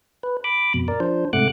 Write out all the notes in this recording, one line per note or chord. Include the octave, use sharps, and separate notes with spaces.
B4
B5 D6
F2 B2
A#4 D5
F3 D4 C5
G#2 C3 A3 F#5 D6 F#6